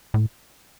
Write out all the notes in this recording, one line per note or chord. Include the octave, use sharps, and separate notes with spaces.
A2